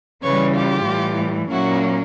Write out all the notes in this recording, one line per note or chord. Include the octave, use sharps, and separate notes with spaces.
C#3 E3 G3 B4 C#5
F4 G4
A2 E3 G3
A#2 F#3 A#3 C#4 E4 F#4